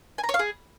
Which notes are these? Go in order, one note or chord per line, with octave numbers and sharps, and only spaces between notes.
G#5
A#5
C#5
F5
G#4